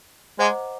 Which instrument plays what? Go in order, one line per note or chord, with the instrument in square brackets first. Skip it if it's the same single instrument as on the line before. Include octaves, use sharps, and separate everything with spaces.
[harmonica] G#3 [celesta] C5 D#5 F#5 A#5 D6